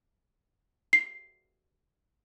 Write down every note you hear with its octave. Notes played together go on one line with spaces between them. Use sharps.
C7